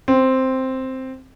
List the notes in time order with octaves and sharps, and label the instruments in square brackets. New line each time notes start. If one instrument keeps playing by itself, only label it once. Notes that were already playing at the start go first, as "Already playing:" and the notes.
[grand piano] C4